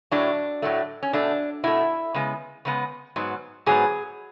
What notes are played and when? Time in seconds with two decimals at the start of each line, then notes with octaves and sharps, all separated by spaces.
0.11 A2 F#3 A3 D4
0.62 A2 F#3 A3
1.03 C#4
1.13 B2 A3 D4
1.64 B2 A3 E4
2.14 C#3 G#3 B3
2.65 C#3 G#3 B3
3.16 G#2 F#3 B3
3.66 G#2 F#3 B3 G#4